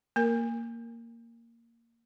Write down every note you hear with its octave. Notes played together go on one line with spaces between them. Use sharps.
A#3 A#4